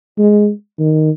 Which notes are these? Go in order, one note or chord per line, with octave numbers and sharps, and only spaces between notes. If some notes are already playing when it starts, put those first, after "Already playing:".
G#3
D#3